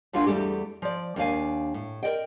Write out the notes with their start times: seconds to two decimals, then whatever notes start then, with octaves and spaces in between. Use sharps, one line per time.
0.13 D#2 D4 F4 F#4 F5 G#5
0.26 E2 G2 G3 A3 G4
0.82 F3 D5
1.16 D#2 D4 C#5 F5 G#5
1.74 A2
2.03 A#4 C5 D5 D#5 G5